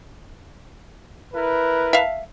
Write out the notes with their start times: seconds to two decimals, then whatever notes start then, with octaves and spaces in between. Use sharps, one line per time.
1.33 E4 A#4 B4
1.93 E5 F5